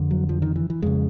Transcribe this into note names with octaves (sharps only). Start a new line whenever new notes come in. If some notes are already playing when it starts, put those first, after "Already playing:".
Already playing: F2 D3
F#3
F3
D#3
E3
E3
F2 C#3 G#3